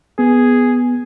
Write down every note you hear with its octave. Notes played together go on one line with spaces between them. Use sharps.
B3 G#4